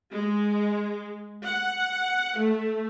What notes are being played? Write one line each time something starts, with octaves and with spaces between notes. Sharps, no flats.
G#3
F#5
A3